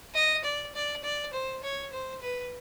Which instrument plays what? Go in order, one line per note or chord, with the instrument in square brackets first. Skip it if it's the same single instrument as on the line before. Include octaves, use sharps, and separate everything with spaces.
[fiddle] D#5
D5
D5
D5
C5
C#5
C5
B4